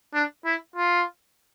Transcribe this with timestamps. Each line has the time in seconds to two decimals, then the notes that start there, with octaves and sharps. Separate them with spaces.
0.14 D4
0.45 E4
0.76 F4